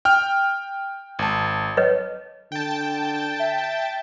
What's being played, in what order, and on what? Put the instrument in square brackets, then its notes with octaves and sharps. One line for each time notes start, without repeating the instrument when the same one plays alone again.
[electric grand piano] G5 F6
G#1 A5
[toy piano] B4 C#5 D#5
[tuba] D3 [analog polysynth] G5 A5
[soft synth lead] E5